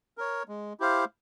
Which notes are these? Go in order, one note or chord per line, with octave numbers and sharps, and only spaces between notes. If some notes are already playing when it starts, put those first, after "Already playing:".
A#4 C#5
G#3
E4 G4 C5 F5